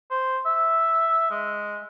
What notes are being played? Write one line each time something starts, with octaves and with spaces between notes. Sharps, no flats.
C5
E5
G#3